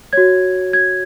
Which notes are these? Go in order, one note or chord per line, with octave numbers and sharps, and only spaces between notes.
F#4 C#5 G#6
G#6